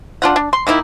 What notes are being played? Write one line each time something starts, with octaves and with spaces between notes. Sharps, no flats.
D4 F4 F#5
D4
C6
D#3 A#3 D#4 E4